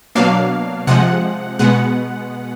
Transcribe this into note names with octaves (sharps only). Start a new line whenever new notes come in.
B2 F#3 A#3 D4 F5
C3 F3 G#3 F#5
B2 G#3 B3 F#5